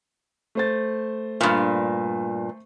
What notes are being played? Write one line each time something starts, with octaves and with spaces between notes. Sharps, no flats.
A3 C5 A6
G2 A#2